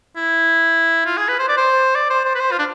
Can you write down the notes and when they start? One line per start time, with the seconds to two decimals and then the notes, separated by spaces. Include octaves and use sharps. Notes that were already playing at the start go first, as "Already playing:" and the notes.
0.16 E4
1.06 F4
1.17 G#4
1.28 B4
1.39 C5
1.48 D5
1.57 C5
1.95 D5
2.10 C5
2.25 C5
2.35 B4
2.40 C5
2.52 F4
2.59 D4